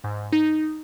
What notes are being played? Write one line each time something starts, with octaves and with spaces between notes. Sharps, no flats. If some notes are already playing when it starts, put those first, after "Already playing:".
G#2
D#4